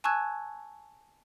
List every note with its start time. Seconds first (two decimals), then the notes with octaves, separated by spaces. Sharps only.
0.04 G#5 A5 C#6 E6 F#6 G#6